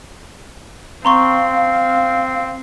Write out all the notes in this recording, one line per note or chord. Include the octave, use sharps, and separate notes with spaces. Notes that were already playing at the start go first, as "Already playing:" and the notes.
C4 F5 A#5 C6 C#6